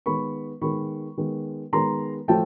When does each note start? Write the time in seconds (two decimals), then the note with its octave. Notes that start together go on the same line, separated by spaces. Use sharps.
0.06 D#3 G#3 B3 B5 C#6
0.62 D#3 G#3 B3 B5 C#6
1.17 D#3 G#3 B3
1.72 D#3 G#3 B3 A#5 C6
2.28 F3 A3 G5 A5